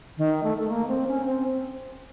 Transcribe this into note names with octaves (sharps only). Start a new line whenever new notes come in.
D#3
A3
A3
A#3
C4
C#4
C4